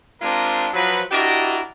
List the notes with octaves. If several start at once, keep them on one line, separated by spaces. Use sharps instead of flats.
G#3 C4 D4 F4 G4 A#4
F3 F#3 B4
D4 E4 F#4 G4 A#4 D#5